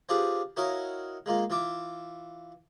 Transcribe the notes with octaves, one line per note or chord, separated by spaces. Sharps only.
C4 D4 F4 G4 G#4 B4
E4 F#4 A#4 C#5 D#5 F5
G#3 A#3 F4
E3 F4 E5 D6